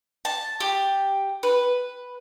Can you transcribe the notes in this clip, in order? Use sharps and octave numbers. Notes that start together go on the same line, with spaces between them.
A5
G4
B4